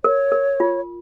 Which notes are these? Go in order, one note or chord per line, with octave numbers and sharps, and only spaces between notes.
A#4 C#5
A#4
F4